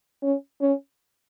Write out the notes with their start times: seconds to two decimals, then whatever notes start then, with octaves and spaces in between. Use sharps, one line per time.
0.23 C#4
0.61 C#4